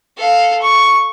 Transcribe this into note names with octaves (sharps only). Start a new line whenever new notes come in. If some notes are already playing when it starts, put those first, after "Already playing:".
A4 F5
C#6